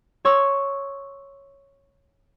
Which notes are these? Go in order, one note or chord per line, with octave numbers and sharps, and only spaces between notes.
C#5 C6 C#6 E6